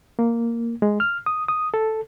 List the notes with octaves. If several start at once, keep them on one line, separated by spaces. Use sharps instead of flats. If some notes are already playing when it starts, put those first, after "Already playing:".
A#3
G#3
F6
D#6
D#6
A4